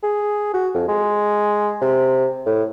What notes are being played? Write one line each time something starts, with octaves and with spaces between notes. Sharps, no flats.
G#4
F#4
F2
G#3
C3
A2